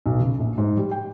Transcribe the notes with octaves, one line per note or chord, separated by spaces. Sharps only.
B1
C#3
A#1
G#2
G3
G5